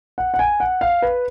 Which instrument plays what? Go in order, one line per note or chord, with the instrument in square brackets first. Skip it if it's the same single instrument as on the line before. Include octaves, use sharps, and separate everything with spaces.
[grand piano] F#5
F#5
G#5
F#5
F5
B4